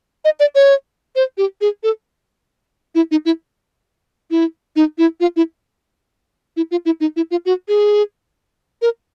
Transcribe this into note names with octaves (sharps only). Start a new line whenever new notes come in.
D#5
D5
C#5
C5
G4
G#4
A4
E4
D#4
E4
E4
D#4
E4
F4
E4
E4
F4
E4
D#4
E4
F4
F#4
G#4
A#4